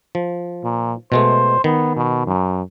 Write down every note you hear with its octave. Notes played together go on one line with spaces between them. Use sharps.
F3
A#2
B2 G#3 A3 C5
D#3 B3
B2
F#2